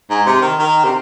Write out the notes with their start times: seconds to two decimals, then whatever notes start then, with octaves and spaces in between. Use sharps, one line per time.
0.10 G#2
0.26 C3
0.42 D#3
0.59 D#3
0.84 C3